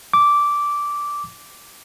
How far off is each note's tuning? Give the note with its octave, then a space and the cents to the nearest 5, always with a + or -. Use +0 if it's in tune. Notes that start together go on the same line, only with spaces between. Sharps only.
D6 -10